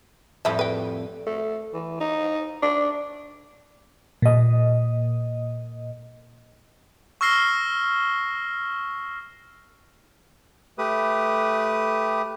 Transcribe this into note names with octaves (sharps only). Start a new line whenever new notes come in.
F2 A2 F3 G3 B4 E5
B4 G5
A3
E3
D#4
D4
A#2 D#5
C#6 E6 F6 A#6 C7 G7
A3 G4 B4 D#6